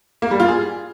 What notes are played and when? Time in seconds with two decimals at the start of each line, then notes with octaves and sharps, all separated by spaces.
0.22 A#3
0.31 G3
0.40 F4
0.48 G#4